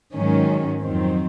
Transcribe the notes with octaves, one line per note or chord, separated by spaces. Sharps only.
G#2 D#3 F#3 C#4
F2 D#3 F#3 C4